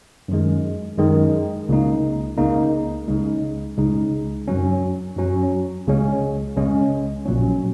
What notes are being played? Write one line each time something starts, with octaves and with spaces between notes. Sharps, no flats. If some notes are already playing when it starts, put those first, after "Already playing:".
F#2 D#3 G#3
F#2 D#3 G#3
C#2 C#3 A#3 D#4
C#2 C#3 A#3 D#4
C#2 C#3 G#3 D#4
C#2 C#3 G#3 D#4
F#2 F#3 C#4
F#2 F#3 C#4
C#2 C#3 G#3 C#4
C#2 C#3 G#3 C#4
A#1 A#2 F#3 C#4